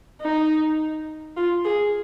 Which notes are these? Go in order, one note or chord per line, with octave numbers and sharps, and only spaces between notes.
D#4
F4
G#4